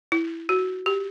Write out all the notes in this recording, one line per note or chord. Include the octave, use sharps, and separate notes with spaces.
E4
F#4
G4